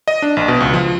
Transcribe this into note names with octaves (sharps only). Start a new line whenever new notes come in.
D#5
D4
A#1
B2
C#2
F3